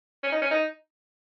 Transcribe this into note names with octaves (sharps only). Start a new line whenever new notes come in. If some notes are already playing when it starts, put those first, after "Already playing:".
C#4
D#4
C#4
D#4